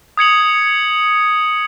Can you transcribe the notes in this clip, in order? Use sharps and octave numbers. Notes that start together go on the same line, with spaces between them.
D#6 G#6 C#7 F#7